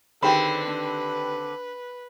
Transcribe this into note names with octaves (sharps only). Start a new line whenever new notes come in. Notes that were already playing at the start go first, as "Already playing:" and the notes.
D3 D#3 C4 G4 G#4 B4 G5 B5
D4